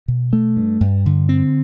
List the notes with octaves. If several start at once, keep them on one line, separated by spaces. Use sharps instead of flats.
B2
A3
G2
G2
D3
C4